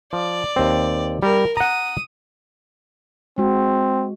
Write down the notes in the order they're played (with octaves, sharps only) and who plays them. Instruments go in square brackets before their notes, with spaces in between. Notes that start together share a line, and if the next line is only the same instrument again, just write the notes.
[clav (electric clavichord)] F3 [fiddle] D5
[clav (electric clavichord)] D#2 C4
[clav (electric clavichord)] G3 [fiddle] A#4
[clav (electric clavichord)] F#5 A#5 [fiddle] D#6
[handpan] G#3 F#4 [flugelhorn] C4